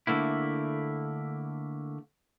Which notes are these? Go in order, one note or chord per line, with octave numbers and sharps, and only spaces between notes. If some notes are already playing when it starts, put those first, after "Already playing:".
D3 A3 A#3 E4